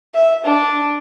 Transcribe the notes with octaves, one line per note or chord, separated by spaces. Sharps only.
E5
D4